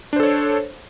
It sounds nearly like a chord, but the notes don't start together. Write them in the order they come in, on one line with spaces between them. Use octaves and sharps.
D4 C5 A4 C#5